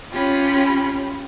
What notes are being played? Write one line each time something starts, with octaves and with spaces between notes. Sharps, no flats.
C#4 F4 G4 B5